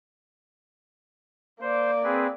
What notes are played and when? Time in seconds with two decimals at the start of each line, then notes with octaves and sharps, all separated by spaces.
1.61 A#3 C5 D5
2.04 C4 G#4 B4